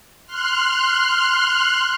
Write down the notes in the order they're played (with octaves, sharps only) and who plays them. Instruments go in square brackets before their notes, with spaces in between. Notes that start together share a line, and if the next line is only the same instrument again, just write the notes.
[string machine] C6 F6 F#6